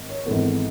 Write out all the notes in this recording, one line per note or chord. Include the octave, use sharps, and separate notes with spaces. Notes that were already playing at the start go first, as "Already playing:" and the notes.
Already playing: G#1
C#5
G#1 G#2 E3 B3 A4